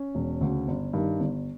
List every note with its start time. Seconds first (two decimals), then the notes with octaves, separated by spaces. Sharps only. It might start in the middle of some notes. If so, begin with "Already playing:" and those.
Already playing: C#4
0.15 E1
0.41 D2 C#3
0.68 G1
0.93 G2 D#3
1.20 G1